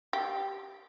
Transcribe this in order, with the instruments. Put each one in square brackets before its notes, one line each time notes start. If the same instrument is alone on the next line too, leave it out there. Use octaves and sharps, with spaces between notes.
[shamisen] G4